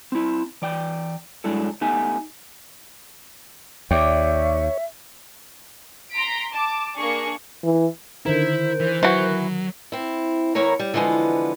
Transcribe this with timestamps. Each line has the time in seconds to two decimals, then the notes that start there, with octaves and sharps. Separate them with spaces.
0.12 C4 E4
0.62 E3 D5 G5
1.44 G2 F#3 G#3 D4 E4 A4
1.81 A3 B3 D#4 G4 E5 G#5
3.91 D#2 G4 C#5 D5 E5 G5
6.12 A#5 C6 B6 D7
6.51 A5 D6
6.96 A#3 D4 G#4 C#6
7.63 E3
8.26 D3 D#3 E4 A#4 C5
8.80 E3
9.03 E3 F#3 F#4
9.92 C4 E4
10.55 E2 E4 A#4 C#5 A#5
10.79 G3
10.94 D3 E3 F3 G#3 B3